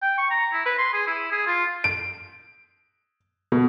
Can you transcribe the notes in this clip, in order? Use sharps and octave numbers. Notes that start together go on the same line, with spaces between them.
G5
C#6
A#5
E4
B4
C6
G#4
E4
G#4
F4
D7
B2